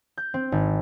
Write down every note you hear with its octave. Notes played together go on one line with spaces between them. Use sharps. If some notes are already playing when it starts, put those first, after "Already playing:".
G6
C4
G#1